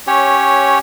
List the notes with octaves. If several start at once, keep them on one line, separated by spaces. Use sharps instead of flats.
C#4 G4 C#5